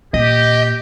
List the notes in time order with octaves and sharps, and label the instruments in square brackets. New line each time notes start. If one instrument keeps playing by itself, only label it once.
[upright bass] A#2 [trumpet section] G4 [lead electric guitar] D#5